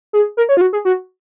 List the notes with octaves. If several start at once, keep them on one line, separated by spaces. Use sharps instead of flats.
G#4
A#4
C#5
F4
F#4
G#4
F#4